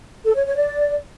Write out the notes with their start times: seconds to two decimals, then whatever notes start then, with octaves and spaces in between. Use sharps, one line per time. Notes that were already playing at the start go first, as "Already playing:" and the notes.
0.25 A4
0.35 C#5
0.45 C#5
0.56 D5